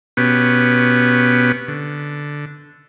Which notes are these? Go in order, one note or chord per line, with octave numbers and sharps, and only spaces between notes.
B2 B3 C#4 G4
D3